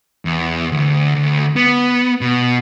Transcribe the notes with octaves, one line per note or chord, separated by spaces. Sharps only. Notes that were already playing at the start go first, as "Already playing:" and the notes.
E2
D2
D2
B3
B2